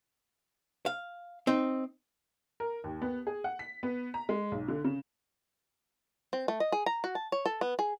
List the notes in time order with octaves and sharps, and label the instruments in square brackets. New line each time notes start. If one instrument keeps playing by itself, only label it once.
[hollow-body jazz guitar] F5
C4 D#4
[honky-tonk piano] A#4
D#2
B3
G#4
F#5
B6
B3
A#5
G#3
B1
D3
C#3
[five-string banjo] C4
A3
D#5
G#4
A#5
F#4
A5
C#5
A4
B3
G#4